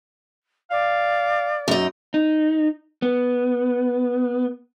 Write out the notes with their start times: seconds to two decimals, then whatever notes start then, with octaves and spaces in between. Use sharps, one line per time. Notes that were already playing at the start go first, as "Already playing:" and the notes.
0.71 D5 F5
1.68 F#2 D#4
2.14 D#4
3.02 B3